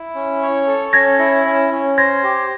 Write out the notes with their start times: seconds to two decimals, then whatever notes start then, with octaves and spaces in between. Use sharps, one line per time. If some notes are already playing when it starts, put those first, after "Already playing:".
Already playing: E4
0.15 C#4
0.42 C#5
0.67 A4
0.93 C#4 G#6 A#6
1.19 E4
1.45 C#4
1.71 C#4
1.98 C5 G#6 A#6
2.23 G4